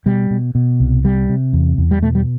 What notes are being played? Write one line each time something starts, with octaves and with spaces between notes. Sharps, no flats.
B2 G3
B2
B2
C2
C3 G3
C3
E2
E2
G3
B2 A3
G3